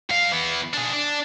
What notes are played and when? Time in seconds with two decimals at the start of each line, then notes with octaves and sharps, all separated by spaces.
0.10 G2 F5
0.32 E3 B3
0.74 D4 G#4
0.93 D4